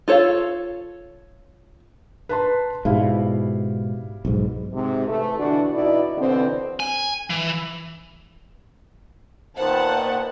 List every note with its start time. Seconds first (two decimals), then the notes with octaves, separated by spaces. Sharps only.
0.08 F4 A4 C#5 D5 F5
2.29 B4 A5 C6
2.85 G#2 B2 G3 E4 F5
4.25 B1 G#2
4.73 G#2 C3
5.08 E3 A3
5.38 B2 D3 E3 D4 F#4
5.73 B2 D#4 E4 F#4 D5
6.18 B2 D3 E3 C4
6.80 G#5
7.30 E3
9.58 A#2 D#3 B3 C5 F#5 A5